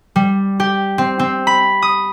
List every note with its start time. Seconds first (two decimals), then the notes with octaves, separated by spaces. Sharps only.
0.16 G3
0.60 G4
0.98 C4
1.19 C4
1.47 B5
1.82 D#6